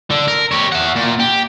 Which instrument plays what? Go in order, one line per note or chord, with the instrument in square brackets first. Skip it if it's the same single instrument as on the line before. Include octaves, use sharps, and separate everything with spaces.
[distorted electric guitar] D3
A#4
G4 C#5
E5 F#5
A#2
G4